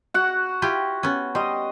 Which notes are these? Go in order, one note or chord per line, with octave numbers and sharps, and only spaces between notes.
F#4 F#5
E4 F4 G4
B3 C#4
G3 D#5 C6